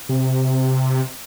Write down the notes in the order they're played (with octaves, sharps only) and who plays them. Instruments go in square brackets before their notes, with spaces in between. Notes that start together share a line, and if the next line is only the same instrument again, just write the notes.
[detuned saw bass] C3